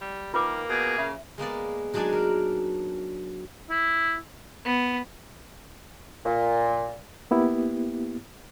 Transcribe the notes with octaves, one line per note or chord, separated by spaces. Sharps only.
G3
D#3 A#3 F4 B4 D6
B2 G#4
C#3 E5
G#3 A#3 B3 D5
F#3 G#3 D4 D#4 D5 G#5
A#4
E4
B3
A#2
A#3 B3 E4 G4